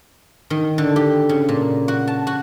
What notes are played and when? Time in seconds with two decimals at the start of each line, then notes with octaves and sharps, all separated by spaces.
0.50 D#3
0.78 D3
0.96 G4
1.29 C#3
1.49 A#2
1.88 F#4
2.07 A5
2.27 F#4